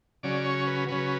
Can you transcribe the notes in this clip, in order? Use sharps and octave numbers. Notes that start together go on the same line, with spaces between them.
C#3 F#3 C#4 D5
C#5
B4
C#3 F#3 C#4 B4